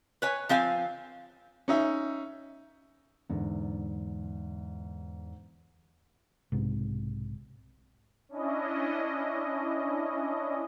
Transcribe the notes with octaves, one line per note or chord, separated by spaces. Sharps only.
B4 C#5 G#5
F3 C4 F5 G#5
C#4 D#4 E5
E2 G#2 D3
B1 G#2 C3
C#4 D4 E4 D#5